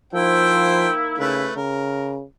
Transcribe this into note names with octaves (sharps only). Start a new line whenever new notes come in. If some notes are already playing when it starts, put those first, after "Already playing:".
F3 A#3 D#4 E4 C5 G5
C#3 A3 B4
C#3 A#4